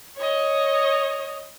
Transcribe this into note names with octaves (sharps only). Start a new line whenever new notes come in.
C#5 D#5